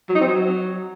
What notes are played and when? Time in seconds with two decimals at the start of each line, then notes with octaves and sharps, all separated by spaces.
0.09 F#3
0.15 D#4
0.21 C4
0.27 F#3